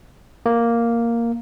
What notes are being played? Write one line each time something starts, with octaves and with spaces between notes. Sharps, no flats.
A#3